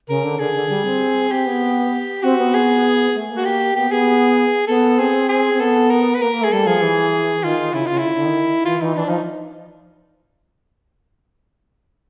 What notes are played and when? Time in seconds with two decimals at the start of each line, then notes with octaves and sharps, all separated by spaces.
0.08 C#3 A#4
0.24 D3
0.39 D3 G#4
0.54 D3
0.69 G3
0.86 C4
1.31 C4 G4
1.47 B3
2.22 C4 F#4
2.39 B3
2.54 G#4
3.15 A3
3.30 A#3
3.37 F#4
3.45 G4
3.76 B3 G4
3.91 B3 G#4
4.67 B3 A4
4.98 C4 G#4
5.29 G#4
5.54 C4
5.60 B3 A4
5.90 A#4
6.14 B4
6.21 A#3 A#4
6.32 A#3
6.42 A3 G#4
6.51 G3 A4
6.67 F3 G#4
6.82 E3
7.43 D#3 F4
7.73 C#3 E4
7.87 C#3 F4
7.98 E4
8.05 D3
8.15 D3
8.25 D#3
8.65 E3 F4
8.81 E3 D#4
8.97 E3 D4
9.06 F3 D#4